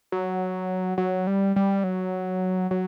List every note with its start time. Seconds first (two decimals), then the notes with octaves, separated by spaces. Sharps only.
0.12 F#3
0.98 F#3
1.27 G3
1.56 G3
1.84 F#3
2.71 F#3